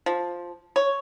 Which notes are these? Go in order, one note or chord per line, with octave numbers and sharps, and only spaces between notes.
F3
C#5